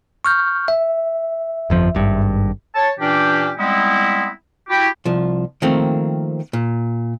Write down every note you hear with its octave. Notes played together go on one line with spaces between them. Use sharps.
C#6 F6 G6
E5
G1 F2 F3
G#1 G2
C#5 A5
A#2 E3 C#4 D4 G4
G3 G#3 B3 C4 D#4 E4
E4 F#4 G4
C2 F3
D#3 F3 A3 A#3 C4
A#2